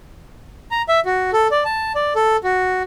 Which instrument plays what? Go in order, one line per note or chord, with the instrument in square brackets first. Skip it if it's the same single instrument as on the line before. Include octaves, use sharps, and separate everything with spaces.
[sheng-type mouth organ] A#5
E5
F#4
A4
D5
A5
D5
A4
F#4